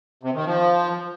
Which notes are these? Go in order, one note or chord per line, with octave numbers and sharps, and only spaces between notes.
C3
D#3
F3